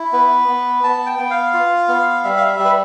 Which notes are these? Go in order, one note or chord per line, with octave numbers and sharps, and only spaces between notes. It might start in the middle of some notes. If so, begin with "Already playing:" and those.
Already playing: E4
B3 B4
B3
B3 A5
G5
B3
F5
F4
B3
G3 E5
F5
E5
G3
B4